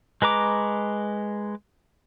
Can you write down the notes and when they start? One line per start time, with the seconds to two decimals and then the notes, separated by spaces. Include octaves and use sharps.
0.22 G#3 B4 A#5 D6